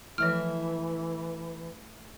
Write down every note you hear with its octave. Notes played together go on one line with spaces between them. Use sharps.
E3 F3 A3 E4 E5 F6